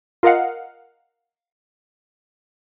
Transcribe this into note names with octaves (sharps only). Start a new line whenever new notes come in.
F4 A#4 D#5 F5 F#5